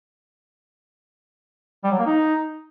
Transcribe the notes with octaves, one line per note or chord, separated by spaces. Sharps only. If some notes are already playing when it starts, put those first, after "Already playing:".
G3
F#3
A#3
D#4